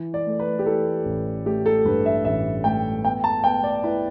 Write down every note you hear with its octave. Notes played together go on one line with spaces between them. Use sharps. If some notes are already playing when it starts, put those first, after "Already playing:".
Already playing: E3
D5
A3
B4
G4
E3 A4
A1
A3 G4
A4
G2 B4
E5
A1 E5
A3 G5
B3 G5
A5
B3 G5
D5
E4 B4